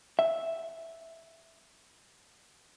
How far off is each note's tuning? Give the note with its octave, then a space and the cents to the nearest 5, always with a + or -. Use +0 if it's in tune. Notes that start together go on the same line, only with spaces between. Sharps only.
E5 +0